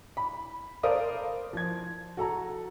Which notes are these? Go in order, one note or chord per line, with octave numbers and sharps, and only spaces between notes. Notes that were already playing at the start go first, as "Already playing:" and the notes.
B5
A4 A#4 C5 D5 F5 D#6
F3 G#6
F#4 A4 A#5